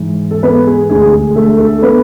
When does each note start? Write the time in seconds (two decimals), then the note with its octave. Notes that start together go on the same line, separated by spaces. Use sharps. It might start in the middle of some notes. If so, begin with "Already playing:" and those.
Already playing: G#2 E3
0.31 A4
0.43 B3 B4
0.67 G#4
0.90 D2 D3 G#3 D4 G#4
1.13 G#4
1.35 A3 A4
1.58 A3 A4
1.82 B3 B4